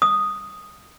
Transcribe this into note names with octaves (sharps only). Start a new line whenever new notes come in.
D#6